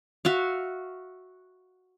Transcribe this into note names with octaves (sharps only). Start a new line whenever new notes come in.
F#4 E5 F5